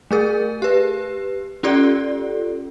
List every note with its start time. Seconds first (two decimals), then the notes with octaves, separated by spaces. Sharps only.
0.11 A3 G#4 A#4
0.62 G4 B4
1.63 C#4 F4 G4 A4 D5